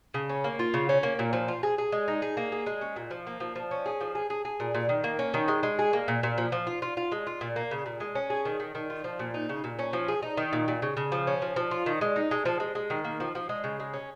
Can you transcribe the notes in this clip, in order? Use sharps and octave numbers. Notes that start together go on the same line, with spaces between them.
C#3
C#4
A#3
F4
C#3
C#4
A#3
A#2
F3
F4
G#4
G#4
G#3
D#4
G#4
A#3
G#4
G#3
C#4
A#2
F3
A#3
F3
F3
C#4
G#4
F3
G#4
G#4
G#4
A#2
A#2
D#3
A#3
C#4
D#3
G#3
G#3
G#4
A#3
A#2
A#2
F3
F3
F4
F4
F4
G#3
F4
A#2
A#3
C#3
A#2
G#3
C#4
G#4
D#3
D#3
D#3
F4
F3
A#2
D#4
C#3
A#2
C#4
F3
G#4
D#4
D#3
A#2
A#2
C#3
C#3
F3
C#4
F3
F3
F4
D#3
G#3
D#4
G#3
F3
G#3
G#3
D#3
A#3
F3
F3
G#3
C#3
G#3
C#4